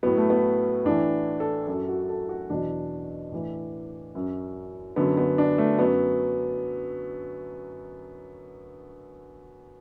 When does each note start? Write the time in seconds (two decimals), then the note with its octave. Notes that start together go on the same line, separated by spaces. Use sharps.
0.03 A2 F#3 B3
0.17 A3
0.30 B3
0.85 A2 E3 D4
1.40 A4
1.67 F#2 F#3 A4
1.89 F#4
2.09 A4
2.29 F#4
2.50 E2 B2 F#3 D4
3.32 A2 E3
4.15 F#2 F#3
4.96 F#2 D3 F#3 B3
5.17 B3
5.38 D4
5.58 A3
5.79 F#2 F#3 B3